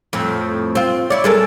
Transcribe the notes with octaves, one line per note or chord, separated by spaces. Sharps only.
F2 A2 C4
C4 F4
E4 C#5 D5
G#3 A4 A#4